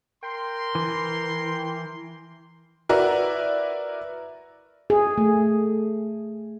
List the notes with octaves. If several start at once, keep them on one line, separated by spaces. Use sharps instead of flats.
A#4 G5 C6
E3
E4 F#4 A#4 B4 D5 E5
G#4
A3